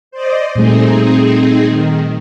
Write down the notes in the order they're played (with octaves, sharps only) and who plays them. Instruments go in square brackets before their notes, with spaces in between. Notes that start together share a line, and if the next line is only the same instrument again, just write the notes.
[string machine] C5 D5 D#5
[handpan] A#2 G3 A3 [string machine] C4 D#4 G#4
[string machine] D#3